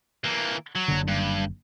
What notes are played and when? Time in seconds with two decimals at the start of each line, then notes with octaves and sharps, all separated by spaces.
0.24 E3 A#3
0.75 F#3
0.88 F#1 D3
1.08 G2